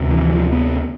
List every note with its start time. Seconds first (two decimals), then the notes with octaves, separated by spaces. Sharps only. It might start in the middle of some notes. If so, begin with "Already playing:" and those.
Already playing: D2 C3
0.10 E3
0.21 E3
0.31 F3
0.52 B3